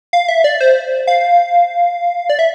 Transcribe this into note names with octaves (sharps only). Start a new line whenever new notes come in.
F5
E5
D5
C5
F5
D5
E5